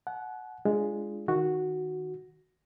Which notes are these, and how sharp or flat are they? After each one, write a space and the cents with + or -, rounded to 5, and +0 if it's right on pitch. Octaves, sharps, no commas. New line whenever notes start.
F#5 +0 A5 -45
G#3 +0 D4 +0 F4 -20
D#3 +0 F#4 -5